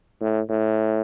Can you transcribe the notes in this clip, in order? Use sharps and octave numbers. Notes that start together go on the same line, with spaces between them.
A2
A2